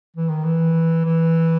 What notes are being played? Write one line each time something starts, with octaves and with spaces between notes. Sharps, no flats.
E3
D#3
E3
E3